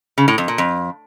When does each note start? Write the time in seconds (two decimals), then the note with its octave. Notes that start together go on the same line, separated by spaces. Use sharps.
0.18 C#3
0.28 A2
0.38 F2
0.48 A#2
0.58 F2